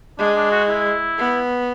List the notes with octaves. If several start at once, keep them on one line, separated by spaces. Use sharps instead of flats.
G#3 D4
D4
F#4
E4
B3